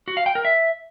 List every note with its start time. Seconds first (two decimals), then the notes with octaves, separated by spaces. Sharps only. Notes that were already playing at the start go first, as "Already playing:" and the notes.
0.08 F#4
0.17 F5
0.26 G5
0.35 A#4
0.45 E5